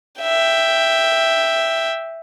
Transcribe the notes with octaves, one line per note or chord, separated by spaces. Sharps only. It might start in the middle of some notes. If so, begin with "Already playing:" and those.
E5 G5